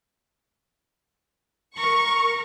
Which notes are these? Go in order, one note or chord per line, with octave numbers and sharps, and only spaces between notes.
A#4 C#6